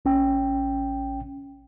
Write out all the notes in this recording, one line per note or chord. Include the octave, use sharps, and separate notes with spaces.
A1 C#4 G5